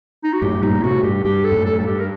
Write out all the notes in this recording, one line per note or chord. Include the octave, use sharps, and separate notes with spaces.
D#4
F#4
F#2 A2 G4
G2 A#2 D#4
A2 C3 F#4
G2 G4
G2 G4
A4
F#2 A2
A4
G2 A4
G4
A#4